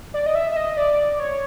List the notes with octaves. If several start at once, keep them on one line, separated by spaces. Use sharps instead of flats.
D5
D#5
E5
E5
D#5
D5
C#5